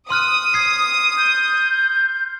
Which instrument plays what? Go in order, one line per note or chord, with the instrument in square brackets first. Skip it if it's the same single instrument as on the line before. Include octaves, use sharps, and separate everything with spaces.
[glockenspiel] C6 F6 F#6 [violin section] D#6
[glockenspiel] G#6 C7
[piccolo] G6